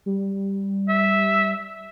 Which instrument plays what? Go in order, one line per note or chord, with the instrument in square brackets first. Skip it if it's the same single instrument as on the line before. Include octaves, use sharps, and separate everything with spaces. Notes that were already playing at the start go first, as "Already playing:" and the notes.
[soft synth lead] G3
[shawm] E5